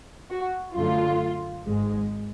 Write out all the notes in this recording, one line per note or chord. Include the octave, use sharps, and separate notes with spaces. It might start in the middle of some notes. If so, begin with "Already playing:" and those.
F#4
F#2 D3 F#3 A3 F4
G#1 G#2 G#3